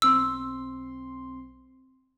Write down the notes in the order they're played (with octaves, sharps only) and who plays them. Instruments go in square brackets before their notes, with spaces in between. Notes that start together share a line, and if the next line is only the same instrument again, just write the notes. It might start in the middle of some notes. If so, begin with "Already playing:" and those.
[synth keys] B1 C4 C6 [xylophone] E6